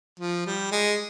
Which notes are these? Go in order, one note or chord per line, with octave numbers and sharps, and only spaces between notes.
F3
G3
G#3